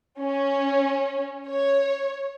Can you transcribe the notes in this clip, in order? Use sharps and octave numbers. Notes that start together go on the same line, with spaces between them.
C#4
C#5